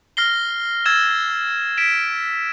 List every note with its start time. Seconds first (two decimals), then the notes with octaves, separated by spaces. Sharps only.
0.17 F6 A#6 C7 G7
0.85 E6 G#6 A6 E7
1.77 B6 D7 E7